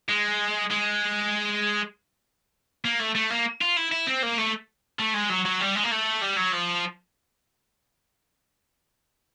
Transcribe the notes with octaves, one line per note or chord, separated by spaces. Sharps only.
G#3
G#3
A#3
A3
A3
A#3
F4
E4
E4
C4
A#3
A3
A3
G#3
F#3
F#3
G3
G#3
A#3
A3
G3
F#3
F3